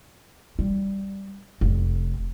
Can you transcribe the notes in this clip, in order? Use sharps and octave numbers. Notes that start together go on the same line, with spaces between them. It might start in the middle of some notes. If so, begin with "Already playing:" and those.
G3
F1